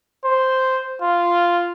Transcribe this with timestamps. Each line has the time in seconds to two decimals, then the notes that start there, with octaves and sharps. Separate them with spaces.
0.25 C5
1.02 F4